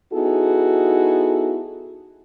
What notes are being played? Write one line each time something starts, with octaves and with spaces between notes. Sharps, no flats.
B3 D#4 E4 F#4 G#4 A4